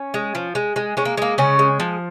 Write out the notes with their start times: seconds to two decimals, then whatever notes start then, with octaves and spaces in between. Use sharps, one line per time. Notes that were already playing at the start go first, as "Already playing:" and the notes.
Already playing: C#4
0.14 G#3
0.35 F3
0.55 G#3
0.76 G#3
0.97 G#3 C#4
1.05 A#3
1.17 G#3 A#3
1.38 C#3 C#4
1.59 G#3
1.80 F3